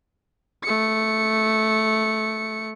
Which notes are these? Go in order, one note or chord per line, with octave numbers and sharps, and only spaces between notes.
A3 C#7